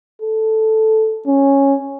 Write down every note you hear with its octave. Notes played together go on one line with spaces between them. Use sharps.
A4
C#4